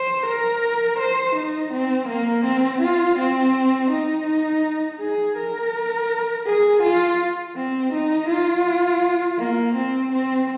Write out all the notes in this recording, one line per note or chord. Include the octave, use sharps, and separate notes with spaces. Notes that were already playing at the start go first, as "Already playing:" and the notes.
Already playing: C5
A#4
C5
D#4
C4
A#3
C4
F4
C4
D#4
G#4
A#4
G#4
F4
C4
D#4
F4
A#3
C4
C4